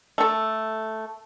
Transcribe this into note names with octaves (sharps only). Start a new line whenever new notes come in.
A3 A4